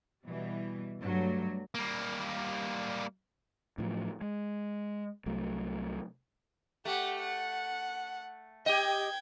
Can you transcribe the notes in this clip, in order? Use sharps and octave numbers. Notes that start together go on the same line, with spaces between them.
B2 E3 G3
G2 F#3 G3 A3
G3 A#3
A2 F3 F#3
G#3
C2 F#3 A3
A3 G4 F#5
F#5
G4 D#5 G5 G#6